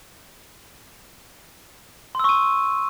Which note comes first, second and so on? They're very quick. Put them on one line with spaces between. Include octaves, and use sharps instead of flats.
C6 E6 C#6 D#7